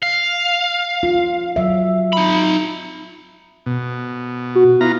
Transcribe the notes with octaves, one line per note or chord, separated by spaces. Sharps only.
F5
F4
F#3 E5
D#4 B5
B2
F#4
B3 E4 F4 A#5